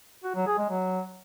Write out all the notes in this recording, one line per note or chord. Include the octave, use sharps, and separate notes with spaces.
F#4
F#3
G#4
G#3
F#3